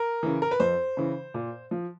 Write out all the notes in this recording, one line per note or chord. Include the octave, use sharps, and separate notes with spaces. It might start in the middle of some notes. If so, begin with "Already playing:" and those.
Already playing: A#4
C#3 E3
A#4
B4
F2 C5
C#3 E3
A#2
F3